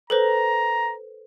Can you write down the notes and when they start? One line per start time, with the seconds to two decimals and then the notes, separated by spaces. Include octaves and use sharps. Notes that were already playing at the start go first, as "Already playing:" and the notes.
0.10 A4 B4 C5 A#5